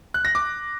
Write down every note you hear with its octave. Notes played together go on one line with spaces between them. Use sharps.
F#6
A#6
D6